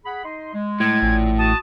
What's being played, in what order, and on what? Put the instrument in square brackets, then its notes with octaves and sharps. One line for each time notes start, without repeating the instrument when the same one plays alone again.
[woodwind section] G#4 F#5 B5
D#4 D#5 C6
G#3
[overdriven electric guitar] A2 [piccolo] G#6
[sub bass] A1 [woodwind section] A#2
[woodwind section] F#4 D#6 [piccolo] A5